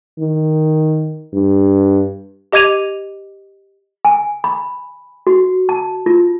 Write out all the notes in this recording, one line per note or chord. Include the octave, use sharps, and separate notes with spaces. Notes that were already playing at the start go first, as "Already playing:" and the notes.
D#3
G2
G4 D#5 D6 G#6 D#7 F7
G#5
B5
F#4
A5
F4